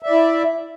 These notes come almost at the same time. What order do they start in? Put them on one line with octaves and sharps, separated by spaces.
E5 D5 E4